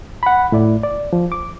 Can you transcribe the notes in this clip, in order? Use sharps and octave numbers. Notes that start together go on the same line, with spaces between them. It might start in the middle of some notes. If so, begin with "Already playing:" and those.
F#5 B5
A2 E4 D5
D5
F3
D6